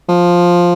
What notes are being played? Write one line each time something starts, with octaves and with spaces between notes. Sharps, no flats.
F3